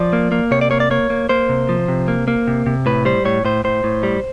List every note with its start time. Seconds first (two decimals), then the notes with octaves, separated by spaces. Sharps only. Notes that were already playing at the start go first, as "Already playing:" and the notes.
Already playing: F3 D5
0.13 A#3
0.32 A#3
0.51 C3 C#5
0.61 D5
0.71 A#3 C#5
0.80 D5
0.91 A#3 C#5
1.10 A#3
1.29 A#3 C5
1.49 C3
1.69 F3
1.88 C3
2.08 A#3
2.28 A#3
2.47 C3
2.66 C3
2.86 A2 B4
3.05 G3 C5
3.25 A2 C#5
3.45 A2 C5
3.64 A2 C5
3.84 A2
4.03 G3